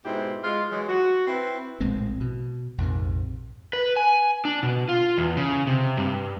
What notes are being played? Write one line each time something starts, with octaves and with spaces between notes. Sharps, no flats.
G#2 B2 C4 E4 G4
G#3 F4
E3 F#3 G#3
F#4
C4 E4 B4
A#1 A2 G#3 C4
B2
A#1 F2 G#2 C3
B4
G#5
D4
B2
F4
E2
C#3
C3
G2